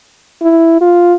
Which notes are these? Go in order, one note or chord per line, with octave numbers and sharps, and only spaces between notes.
E4
F4